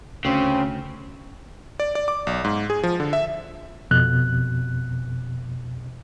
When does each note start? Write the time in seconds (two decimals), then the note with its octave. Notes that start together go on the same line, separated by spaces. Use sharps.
0.25 D2 C#3 C4 C#4
1.80 D5
1.95 D5
2.08 D6
2.27 B1
2.44 G#2
2.70 G#4
2.83 F3
3.00 D3
3.13 E5
3.91 F2 B2 F#6